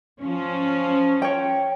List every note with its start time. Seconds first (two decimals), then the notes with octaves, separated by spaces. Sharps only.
0.20 F3 C#4
1.22 C#5 G5